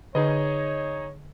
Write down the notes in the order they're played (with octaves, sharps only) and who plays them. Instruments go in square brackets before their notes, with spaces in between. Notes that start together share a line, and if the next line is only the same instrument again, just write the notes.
[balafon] D3 [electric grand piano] D#4 G#4 D#5 [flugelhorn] C#5